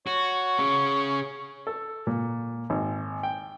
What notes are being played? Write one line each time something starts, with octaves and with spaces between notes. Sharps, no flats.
F#4 C#5
C#3
A4
A#2
G#1
G5